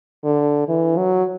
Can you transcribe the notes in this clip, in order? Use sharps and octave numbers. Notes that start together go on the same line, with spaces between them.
D3
E3
F#3